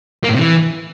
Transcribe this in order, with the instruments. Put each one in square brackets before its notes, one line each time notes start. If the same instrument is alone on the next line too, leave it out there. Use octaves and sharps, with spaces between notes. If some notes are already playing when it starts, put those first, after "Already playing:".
[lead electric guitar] A#3
A2
C3
E3